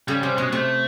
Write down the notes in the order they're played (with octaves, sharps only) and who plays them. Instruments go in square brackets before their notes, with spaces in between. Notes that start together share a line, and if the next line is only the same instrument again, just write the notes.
[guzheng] C#3 [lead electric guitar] G3
[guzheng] C3 [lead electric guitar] G3
[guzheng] B2 [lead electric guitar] G#3
[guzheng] C3 [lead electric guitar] A3